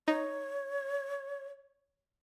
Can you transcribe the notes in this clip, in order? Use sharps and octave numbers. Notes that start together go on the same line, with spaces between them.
D#4 C#5